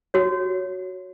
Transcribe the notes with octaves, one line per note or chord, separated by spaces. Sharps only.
F#4 C#5